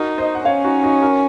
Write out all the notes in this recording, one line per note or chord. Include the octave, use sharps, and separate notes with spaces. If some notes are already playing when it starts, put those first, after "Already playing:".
Already playing: D#4 F#4 A#4
C5 D#5
F#5
C#4 C#5 F5
D#4 F#4
D#4 F#4
F#4 A#4